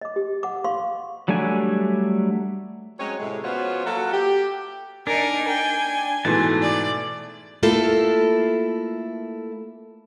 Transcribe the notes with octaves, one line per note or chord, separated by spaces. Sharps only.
D#5 D6
G4
F#5 D6
F5 C6 C#6
F#3 G3 A3 D4 G#5
F#3 G#3 C4 C#4 C#5
A2 C3 G#3
F3 B3 C#4 F4 F#4 C#5
F#3 A#3 F#4 A4 E5 F#5
G4
D4 D#4 A#4 G#5
G5
G#2 B2 E3 A3 A5
D5
A3 A#3 E4 F4 A4